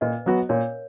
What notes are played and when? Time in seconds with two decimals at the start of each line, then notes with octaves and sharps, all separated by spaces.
0.01 A#2 B4 D#5
0.26 F#3 B3 F#4
0.49 A#2 A#4 C#5